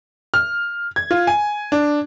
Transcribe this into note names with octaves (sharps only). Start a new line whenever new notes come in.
F6
G#6
F4
G#5
D4